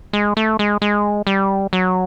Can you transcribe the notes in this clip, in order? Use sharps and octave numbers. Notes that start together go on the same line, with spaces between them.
G#3
A3
G#3
G#3
G3
F#3